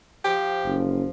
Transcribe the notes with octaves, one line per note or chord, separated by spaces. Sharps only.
F3 G4
F#1